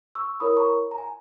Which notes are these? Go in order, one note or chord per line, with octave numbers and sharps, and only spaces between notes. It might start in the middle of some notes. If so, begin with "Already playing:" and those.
C#6 E6
E4 A#4 C#5 B5 D#6
A#5 C#6
A#5
G#5